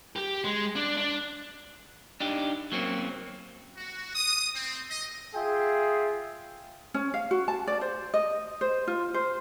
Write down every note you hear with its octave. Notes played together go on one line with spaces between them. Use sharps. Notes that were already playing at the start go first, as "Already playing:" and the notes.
G4
G#3
D4
D4
D4 D#4 G4
F#3 A#3 C4 C#4
F#4
D#6
C4
D#5
F4 G#4 E5 G5
C#4
F5
F#4
A5
D5
C5
D#5
C5
F4
C5